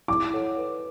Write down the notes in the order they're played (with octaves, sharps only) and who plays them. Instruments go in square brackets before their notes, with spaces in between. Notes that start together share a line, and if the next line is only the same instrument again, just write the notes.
[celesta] E4 [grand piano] D6
[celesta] A4 C#5 F#5
B4